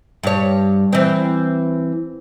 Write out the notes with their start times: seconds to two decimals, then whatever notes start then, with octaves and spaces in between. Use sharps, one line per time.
0.23 G2 C#5
0.93 E3 C4